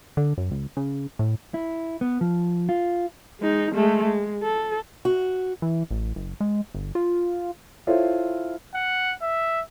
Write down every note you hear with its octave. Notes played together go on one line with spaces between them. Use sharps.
D3
F#2
C#2
C#3
A2
E4
B3
F3
F4
G#3 D#4
G#3 A3
G#3
A4
F#4
E3
A1
F#1
G#3
G1
F4
E4 F4 A4 C5 C#5 E5
F#5
E5